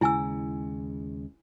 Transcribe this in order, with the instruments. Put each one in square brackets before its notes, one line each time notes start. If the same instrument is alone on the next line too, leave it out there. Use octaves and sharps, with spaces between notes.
[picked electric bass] D#2 C#3 G#3 [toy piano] E4 G#5 E6